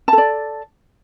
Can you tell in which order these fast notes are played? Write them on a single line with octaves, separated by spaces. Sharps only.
A5 A4 D5